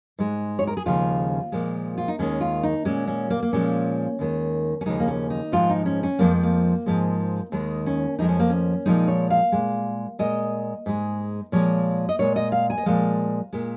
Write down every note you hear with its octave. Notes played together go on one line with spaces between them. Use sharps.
G#2 G#3
C#5
A#4
G#4
D#2 C#3 F3 G#3 F4
A#2 F3 G#3
F4
D#4
D#2 D#3 G#3 C#4
F4
D#4
A#2 G#3 C#4
C#4
A#3
A#3
A#2 F3 G#3 C#4
D#2 D#3 G#3
C#4
D#2 C#3 F3 G#3 D#4
A#3
C#4
D#4
G#2 F3 G#3 F4
D#4
C#4
C#4
F2 F3 G#3 A#3
A#3
G#2 F3 G#3
D#2 D#3 G#3
C#4
F2 F3 G#3 D#4
C#4
A#3
C#4
A#2 F3 G#3 D#4
C#5
F5
A#2 G#3
A#2 G#3 D#5
G#2 G#3
A#2 F3 G#3 C#5
D#5
A#2 G#3 C#5
D#5
F5
G#5
D#5
A#2 F3 G#3 F5
A#2 G#3